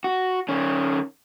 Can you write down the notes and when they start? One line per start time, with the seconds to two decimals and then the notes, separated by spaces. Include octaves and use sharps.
0.04 F#4
0.49 D#3 C#4